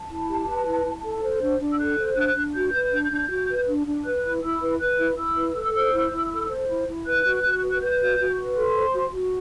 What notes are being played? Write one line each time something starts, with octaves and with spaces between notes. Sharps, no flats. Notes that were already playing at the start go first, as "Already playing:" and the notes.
Already playing: A5
E4
G4
B4
E4
E4
A4
C5
D4
D4
E6
A4 F#6
C5
D4 F#6
D4
F#4 G6
B4
D4
D4
F#4
B4
D4
D4
B4 F#6
E4
E4 E6
B4
B4 F#6
E4
E4 E6
B4
A4
C5
E4
E4
A4
C5
E4
E4
B4 F#6
F#4
F#4
B4
F#6
B4 G6
F#4
F#4
B4
A4 C6
C5
F#4
F#4